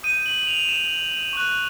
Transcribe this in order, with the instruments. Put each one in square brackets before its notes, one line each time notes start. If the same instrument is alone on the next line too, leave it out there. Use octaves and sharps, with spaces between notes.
[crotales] D#6 G6 D#7
F#7
F7
E7
C#6 F#6